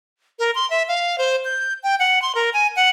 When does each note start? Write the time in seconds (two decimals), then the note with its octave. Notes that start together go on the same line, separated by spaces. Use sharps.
0.39 A#4
0.55 C6
0.70 E5
0.88 F5
1.18 C5
1.45 G6
1.83 G5
2.00 F#5
2.22 C6
2.35 A#4
2.53 G#5
2.76 F#5